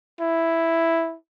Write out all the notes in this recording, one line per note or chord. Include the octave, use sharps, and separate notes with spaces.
E4